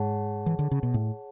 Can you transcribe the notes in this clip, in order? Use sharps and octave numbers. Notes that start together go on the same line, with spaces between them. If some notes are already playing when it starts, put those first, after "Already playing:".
Already playing: G#2 G#4 C#5 F#5 A5
E3
D3
C#3
B2
A2